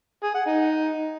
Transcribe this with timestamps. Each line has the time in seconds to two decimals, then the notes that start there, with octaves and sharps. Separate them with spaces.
0.23 G#4
0.34 F#5
0.46 D#4